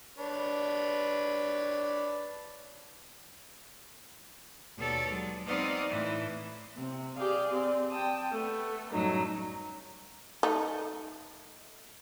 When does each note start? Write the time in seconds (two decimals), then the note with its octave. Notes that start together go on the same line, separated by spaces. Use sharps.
0.19 D4 B4 C#5
4.78 D#2 B2 A4 C#5 D5
5.10 F#3 G#3
5.46 B3 C4 D#4 D5 D#5 F5
5.89 A2 E3
6.76 C3 C4
7.15 G4 G#4 D5 F5
7.52 C4 D5
7.90 G5 A5 D#6
8.30 A3 B3
8.92 F#2 A2 F#3 G3 A3 D#4
10.43 A3 D#4